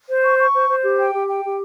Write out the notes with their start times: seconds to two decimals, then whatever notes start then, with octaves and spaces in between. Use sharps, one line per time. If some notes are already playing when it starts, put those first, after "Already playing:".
0.09 C5
0.23 C#6
0.38 C#6
0.53 C5
0.69 C5
0.83 G4
0.98 G5
1.13 G4
1.28 G5
1.43 G4